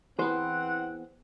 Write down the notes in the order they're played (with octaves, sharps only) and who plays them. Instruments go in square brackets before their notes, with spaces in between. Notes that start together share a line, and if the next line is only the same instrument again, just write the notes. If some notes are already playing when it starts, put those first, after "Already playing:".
[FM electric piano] E3 B3 [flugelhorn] C4 [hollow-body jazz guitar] G#4 C5 [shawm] F#5